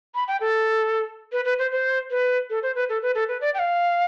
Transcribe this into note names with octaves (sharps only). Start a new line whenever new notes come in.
B5
G5
A4
B4
B4
C5
C5
B4
A4
C5
B4
A4
B4
A4
B4
D5
G5
F5